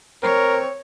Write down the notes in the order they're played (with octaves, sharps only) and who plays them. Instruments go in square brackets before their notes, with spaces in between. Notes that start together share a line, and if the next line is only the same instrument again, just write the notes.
[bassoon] C4 [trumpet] A#4 [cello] C#5